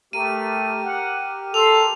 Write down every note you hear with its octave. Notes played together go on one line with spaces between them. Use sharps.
A3 G4 A#4 D#7
F#5
A4 C6 F7